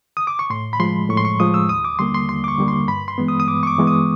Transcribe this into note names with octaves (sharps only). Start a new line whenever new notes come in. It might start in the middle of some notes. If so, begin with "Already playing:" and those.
D#6
D6
C#6
A2 C6
B5
F3 G#3 C6
A2 C#6
C6
C#6
F3 G#3 D#6
E6
D#2 D#6
D6
D3 G3 A#3 C6
C6
D#2 C6
D6
C#6
D3 G3 A#3
C6
G2 B5
C6
E3 G#3 B3
D#6
D#6
G2 D6
C#6
D6
E3 G#3 B3
D#6